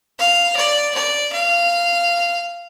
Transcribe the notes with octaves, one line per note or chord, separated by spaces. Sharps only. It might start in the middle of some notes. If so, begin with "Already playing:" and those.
F5
D5
D5
F5